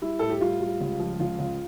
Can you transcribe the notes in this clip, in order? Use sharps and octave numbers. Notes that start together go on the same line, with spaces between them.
G3 E4
A2 A4
G4
G3 F4
G3
C#2
F3
C#2 F4
C#2